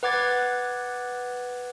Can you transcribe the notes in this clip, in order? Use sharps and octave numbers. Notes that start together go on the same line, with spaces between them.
B4 F#5 D6 G#6 A6